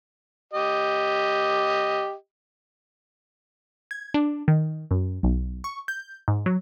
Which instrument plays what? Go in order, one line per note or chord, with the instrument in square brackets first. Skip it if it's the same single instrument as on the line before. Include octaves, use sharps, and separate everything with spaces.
[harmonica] G4 D#5
[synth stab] G#6
D4
D#3
F#2
B1
C#6
G6
G#2
F#3